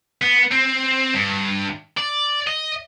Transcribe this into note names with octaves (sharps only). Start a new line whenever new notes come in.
B3
C4
G2
D5
D#5